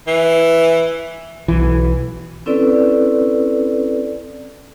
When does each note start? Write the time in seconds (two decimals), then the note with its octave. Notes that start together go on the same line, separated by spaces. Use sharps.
0.07 E3
1.48 B1 E3
2.46 C4 C#4 E4 A4 B4 D5